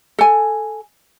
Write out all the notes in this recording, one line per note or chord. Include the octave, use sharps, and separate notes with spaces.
A4 G#5